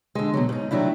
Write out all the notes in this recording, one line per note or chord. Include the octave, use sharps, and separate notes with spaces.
D3 G#3
B2 F#3
G#2 D#4
D#3 F#3 A3 D4 E4